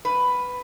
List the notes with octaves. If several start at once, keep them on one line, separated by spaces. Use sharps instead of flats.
F#2 B4